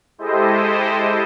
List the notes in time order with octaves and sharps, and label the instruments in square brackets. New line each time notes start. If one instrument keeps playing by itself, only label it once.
[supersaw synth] G#3 E4 G4 A4 C5 D#5